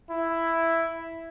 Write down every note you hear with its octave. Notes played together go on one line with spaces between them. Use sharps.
E4